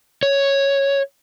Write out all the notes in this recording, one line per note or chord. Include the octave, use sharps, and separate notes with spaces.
C#5